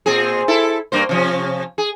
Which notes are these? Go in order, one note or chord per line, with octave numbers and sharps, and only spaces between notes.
A#2 C4 G#4
E4 A4
G2 A#3 C5
C3 F3 C#4
G#4